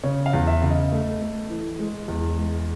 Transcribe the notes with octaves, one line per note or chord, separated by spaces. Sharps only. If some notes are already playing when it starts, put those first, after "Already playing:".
C#3 C#5
F5
E2
E5
C#3
D#5
A3
A3
E3
G#3
E2
G#3